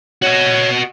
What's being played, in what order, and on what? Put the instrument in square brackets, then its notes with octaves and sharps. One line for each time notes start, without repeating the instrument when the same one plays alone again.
[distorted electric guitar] F#4 D#5 [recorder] C#5